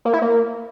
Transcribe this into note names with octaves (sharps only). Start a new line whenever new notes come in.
A#3
E4
A#3